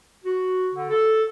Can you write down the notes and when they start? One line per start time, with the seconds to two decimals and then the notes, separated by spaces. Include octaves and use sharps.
0.25 F#4
0.75 D3
0.90 A4